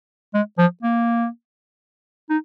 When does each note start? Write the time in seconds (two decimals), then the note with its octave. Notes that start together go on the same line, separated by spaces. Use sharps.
0.34 G#3
0.58 F3
0.83 A#3
2.30 D#4